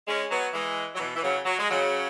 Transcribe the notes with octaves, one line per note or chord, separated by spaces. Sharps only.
G#3 C#4
F#3 B3
E3 G#3
F#3
B2 E3
E3
C#3 F#3
F#3
G#3
C#3 F#3